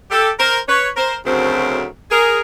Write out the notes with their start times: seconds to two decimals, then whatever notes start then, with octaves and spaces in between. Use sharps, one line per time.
0.11 G4 A4
0.39 A#4 C5
0.69 B4 C#5
0.97 A#4 C5
1.25 D2 C#3 F#3 A3 C4 A#4 C5
2.11 G#4 A#4